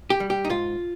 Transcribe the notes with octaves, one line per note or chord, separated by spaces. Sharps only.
G4
G3
G4
D#4
G#2 F4